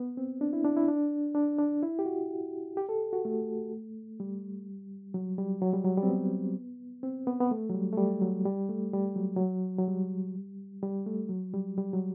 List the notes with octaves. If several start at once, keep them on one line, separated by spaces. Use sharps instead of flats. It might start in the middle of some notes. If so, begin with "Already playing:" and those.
Already playing: B3
C4
D4
E4
D4
E4
D4
D4
D4
E4
G4
F#4
G4
A4
F#4
A3
G3
F#3
G3
F#3
G3
F#3
G3
C4
B3
C4
B3
B3
A3
F#3
G3
A3
G3
F#3
G3
A3
G3
F#3
F#3
F#3
G3
G3
A3
F#3
G3
G3
F#3